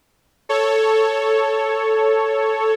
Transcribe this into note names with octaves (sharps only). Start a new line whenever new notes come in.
A4 C#5